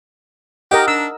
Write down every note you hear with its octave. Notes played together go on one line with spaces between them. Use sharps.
G4 A#4 D#5 F#5
D4 E6